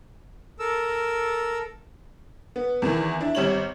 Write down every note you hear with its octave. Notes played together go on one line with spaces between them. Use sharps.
A4 A#4 E6
B3
E2 D#3 E3
D4 E4
G#1 G3 C#5 F#7